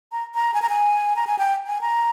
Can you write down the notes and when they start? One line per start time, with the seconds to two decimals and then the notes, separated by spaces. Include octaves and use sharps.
0.12 A#5
0.35 A#5
0.54 G#5
0.62 A#5
0.69 G#5
1.16 A#5
1.27 G#5
1.39 G5
1.67 G#5
1.81 A#5